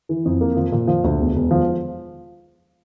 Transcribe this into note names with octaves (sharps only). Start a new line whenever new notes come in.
E3
F2
A#3
F3
A#2
F3
D2
E1
E1
F3